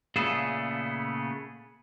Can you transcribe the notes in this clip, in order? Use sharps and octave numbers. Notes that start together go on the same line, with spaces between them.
A#2 C#3 A3 B3 G#4 A4